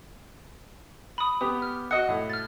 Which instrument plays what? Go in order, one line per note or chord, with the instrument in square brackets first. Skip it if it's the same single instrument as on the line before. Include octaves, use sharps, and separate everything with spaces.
[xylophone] B5 D#6
[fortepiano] B3 G4 [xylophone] D#6
[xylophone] F6
[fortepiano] F#4 D#5 F#5 [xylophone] C#7
[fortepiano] A2
[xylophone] F6 A6